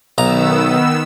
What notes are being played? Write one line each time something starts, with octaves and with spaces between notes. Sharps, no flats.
B1 D#3 B3 A#5 E6